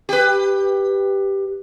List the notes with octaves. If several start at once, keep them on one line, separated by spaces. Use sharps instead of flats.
G4 B4